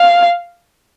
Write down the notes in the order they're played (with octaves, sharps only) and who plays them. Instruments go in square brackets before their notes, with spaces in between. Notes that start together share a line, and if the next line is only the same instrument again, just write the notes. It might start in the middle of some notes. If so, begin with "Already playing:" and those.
Already playing: [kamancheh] F5